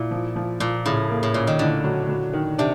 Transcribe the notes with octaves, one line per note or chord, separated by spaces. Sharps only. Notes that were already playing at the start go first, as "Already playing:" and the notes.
Already playing: A#2 E4
F3
F3
A#2 F3
A2 C#3
A#3
A2
A#2 C#4
D#3
A2 D3
F#3
F#3
D#3
C3 D4